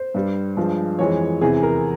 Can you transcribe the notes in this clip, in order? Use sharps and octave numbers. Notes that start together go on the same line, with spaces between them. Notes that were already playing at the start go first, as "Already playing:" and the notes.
Already playing: C5
G2 G3
G2 F3 G#3
F2 E3 G#3 C#5
E2 C3 E3 G#4
A#4